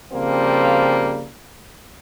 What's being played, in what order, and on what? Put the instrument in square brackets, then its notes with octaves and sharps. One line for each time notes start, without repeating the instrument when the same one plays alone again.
[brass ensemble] C#3 F3 G3 A#3 C4